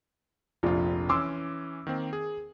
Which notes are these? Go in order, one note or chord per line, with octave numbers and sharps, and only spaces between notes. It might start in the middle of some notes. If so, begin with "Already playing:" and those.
F1 A#1 F3 D4 F4
E3 C#4 C6 D6 E6
D#3 A#3 C4
G#4